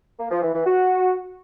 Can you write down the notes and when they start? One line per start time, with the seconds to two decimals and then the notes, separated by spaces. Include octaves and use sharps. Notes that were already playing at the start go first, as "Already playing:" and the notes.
0.19 A#3
0.30 F3
0.42 E3
0.53 E3
0.65 F#4